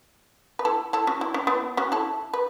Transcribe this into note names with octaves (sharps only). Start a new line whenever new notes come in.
B4
E4 A4
E4 A4
C#4 F#4
E4
C#4
B3 E4
C#4 F#4
E4 A4
B4